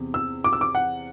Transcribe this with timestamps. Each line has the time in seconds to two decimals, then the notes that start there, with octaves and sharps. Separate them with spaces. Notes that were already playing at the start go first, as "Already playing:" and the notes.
Already playing: E2 C3
0.14 E6
0.44 D6
0.53 E6
0.61 D6
0.75 F#5